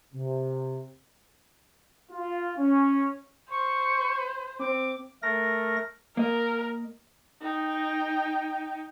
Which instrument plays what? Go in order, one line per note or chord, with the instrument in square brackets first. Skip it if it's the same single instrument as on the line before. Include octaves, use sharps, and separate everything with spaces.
[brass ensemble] C3
F4
C#4
[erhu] C5 [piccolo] C#6
[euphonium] C4 [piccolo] D6
[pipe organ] A3 A#4 A#6
[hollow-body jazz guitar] A#3 D#5 [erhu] A#4
[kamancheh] D#4 G5